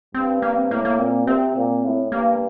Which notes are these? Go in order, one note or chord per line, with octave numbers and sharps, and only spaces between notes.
G2 C4
A#3
C4
A2 A#3
A#3
A#2 C4
C3 C4
A#2
A2
G2 A#3